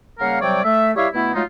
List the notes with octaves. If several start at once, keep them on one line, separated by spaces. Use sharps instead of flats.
C#3 G3 A#3 A#4 F5 F#5
C3 F#3 G3 C#5 D5 G5
A3 E5
G3 E4 G4 C#5 E5 F5
B2 A3 B3 E4
F#3 G#3 A3 D#4 F4